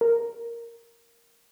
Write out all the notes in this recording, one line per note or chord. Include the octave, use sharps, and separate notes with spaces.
A#4